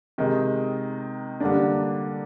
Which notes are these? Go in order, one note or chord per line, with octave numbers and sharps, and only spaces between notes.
C3 D#3 G#3 D#4
D3 G3 A#3 D4